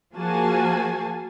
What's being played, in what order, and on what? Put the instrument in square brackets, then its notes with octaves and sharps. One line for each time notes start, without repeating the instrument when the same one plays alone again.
[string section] F3 A#3 F#4 G#4 G#5 A5